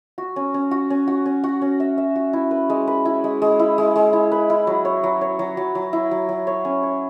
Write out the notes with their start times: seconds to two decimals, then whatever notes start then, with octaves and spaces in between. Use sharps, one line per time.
0.18 F#4
0.36 C#4
0.54 C#4
0.71 F#4
0.90 C#4
1.08 F#4
1.26 C#4
1.44 F#4
1.62 C#4
1.80 E5
1.98 E5
2.15 F#4
2.33 E4
2.51 B4
2.70 G#3
2.87 B4
3.05 E4
3.24 G#3
3.42 G#3
3.59 E4
3.78 G#3
3.96 G#3
4.13 E4
4.32 B4
4.50 E4
4.67 F#3
4.85 C#5
5.04 F#3
5.21 C#5
5.39 F#3
5.57 F#3
5.75 F#3
5.93 E4
6.11 F#3
6.29 F#3
6.47 C#5
6.65 C#4
6.83 C#5